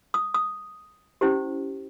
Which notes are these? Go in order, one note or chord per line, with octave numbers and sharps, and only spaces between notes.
D#6
D#6
C#4 E4 G4 C5